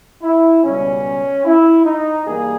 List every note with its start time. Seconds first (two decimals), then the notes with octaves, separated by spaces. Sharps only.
0.22 E4
0.62 C#2 B2 G3 C#4
1.45 E4
1.85 D#4
2.25 G2 E3 G3 A#3 G#4